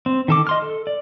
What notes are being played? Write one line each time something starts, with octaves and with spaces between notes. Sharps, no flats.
C4
D#3 A4 D6
D#5 C6 F6
A4
D5